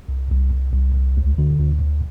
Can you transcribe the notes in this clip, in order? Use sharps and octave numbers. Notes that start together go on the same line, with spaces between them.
C2
C2
C2
C2
C2
D2
D3
D2
D2